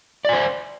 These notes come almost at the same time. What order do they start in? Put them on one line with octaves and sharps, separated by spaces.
D5 G#5 C5